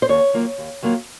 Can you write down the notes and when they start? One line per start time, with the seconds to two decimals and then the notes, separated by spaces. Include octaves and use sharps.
0.02 C5
0.09 D#2 C#5
0.33 D#3 F#3 A#3 F4
0.58 D#2
0.83 D#3 F#3 A#3 F4